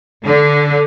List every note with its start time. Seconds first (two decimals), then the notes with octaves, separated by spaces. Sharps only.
0.25 D3